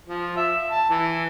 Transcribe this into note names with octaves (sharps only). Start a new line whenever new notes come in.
F3
E5
A5
E3